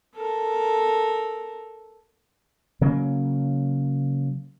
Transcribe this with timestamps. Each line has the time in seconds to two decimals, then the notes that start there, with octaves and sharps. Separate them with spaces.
0.15 A4 A#4
2.81 C#3 F#3 A#3